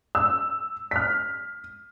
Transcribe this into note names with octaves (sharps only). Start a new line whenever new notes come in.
E6
F6 B6